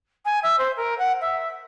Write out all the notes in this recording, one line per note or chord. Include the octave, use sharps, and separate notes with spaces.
G#5
E5
C5
A#4
F#5
E5